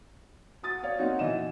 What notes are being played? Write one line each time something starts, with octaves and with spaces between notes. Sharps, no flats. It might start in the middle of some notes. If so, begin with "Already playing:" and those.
F#4 D#6 A6
C#5 D5 F5
A#3 C4 D#4 F#4
E3 F#4 D#5 E7